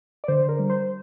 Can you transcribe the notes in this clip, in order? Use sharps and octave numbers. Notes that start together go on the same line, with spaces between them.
D5
D3 C5
A#4
G3
C5